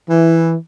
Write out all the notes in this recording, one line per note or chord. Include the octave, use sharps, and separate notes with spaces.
E3